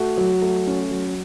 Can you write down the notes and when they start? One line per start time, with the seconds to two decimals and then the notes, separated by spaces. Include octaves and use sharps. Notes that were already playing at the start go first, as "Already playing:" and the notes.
Already playing: A3 F#4
0.18 F#3
0.42 A3
0.67 C#4
0.91 F#3